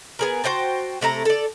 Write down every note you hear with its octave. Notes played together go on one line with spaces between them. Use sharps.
B3 G#4 A#4
F#4 C5 G5 A5
C3 A3 E4 A#5
A4 D5